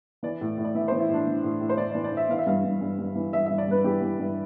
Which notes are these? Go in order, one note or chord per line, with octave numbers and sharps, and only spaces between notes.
E3 D5
A2
A2
D5
E3 E5
C5
E3
E4
A2 D4
E3
A2
A2
C5
A2 D5
D5
E3
D5
E3 E5
E3 F5
E5
G2 F5
G2
G2
G2
E3
G2 E5
E5
G2
D5
G2 B4
E3 G4
E3
G2